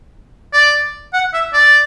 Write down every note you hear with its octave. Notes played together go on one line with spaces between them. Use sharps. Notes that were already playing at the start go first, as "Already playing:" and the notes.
D5
F#5
E5
D5